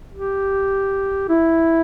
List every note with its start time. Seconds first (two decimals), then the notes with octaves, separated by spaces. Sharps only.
0.13 G4
1.29 E4